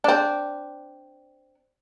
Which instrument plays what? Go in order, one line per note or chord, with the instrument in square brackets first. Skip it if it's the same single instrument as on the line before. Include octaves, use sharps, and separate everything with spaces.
[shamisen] C4 D4